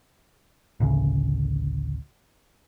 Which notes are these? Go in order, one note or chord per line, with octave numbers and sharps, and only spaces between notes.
A1 D2 C#3